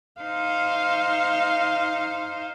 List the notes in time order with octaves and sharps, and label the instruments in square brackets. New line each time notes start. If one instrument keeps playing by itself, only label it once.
[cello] D#4 C5 [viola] F5